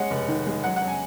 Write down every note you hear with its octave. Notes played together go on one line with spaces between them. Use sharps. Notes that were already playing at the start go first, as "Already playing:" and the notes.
Already playing: G#3 C#4 F#5
F1
D#3
G#3
F#3 F#5
F#5
F#3
G#5